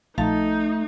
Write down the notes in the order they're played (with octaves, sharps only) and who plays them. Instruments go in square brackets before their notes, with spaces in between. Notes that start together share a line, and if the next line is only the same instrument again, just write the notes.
[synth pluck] A#1 F3 A6 [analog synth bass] A3 [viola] D#4 [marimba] F5 A5 A#5